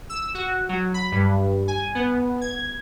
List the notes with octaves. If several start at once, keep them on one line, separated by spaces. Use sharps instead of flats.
E6
F#4
F#3
B5
G2
G#5
B3
G#6